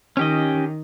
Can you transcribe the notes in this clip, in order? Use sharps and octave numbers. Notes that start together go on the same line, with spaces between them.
D#3 C#4 G4 D#5